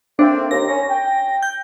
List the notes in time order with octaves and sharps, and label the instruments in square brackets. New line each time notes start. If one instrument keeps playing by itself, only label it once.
[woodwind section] A3 A#3 C4 [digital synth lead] D4
[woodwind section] D#2 [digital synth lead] A#6
[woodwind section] C#4
G5
[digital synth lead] G6